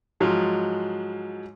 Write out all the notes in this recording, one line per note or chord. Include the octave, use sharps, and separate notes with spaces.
G#2 F3 F#3 G#3 F4